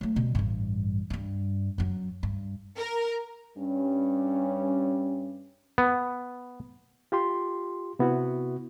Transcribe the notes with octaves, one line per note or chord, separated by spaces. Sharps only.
F#3 A3
B2 G3
A1 G2
G2 G3
F#2 F#3
G2
A#4
G2 G3 C#4
B3
F4 G4 C6
C3 B3 E4 F#4